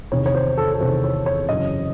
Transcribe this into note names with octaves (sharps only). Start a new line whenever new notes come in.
E2 C3 D#3 C#5
C#5
C5
A4
A4
E2 C3 D#3 C5
C#5
C#5
F#2 C#3 E3 D#5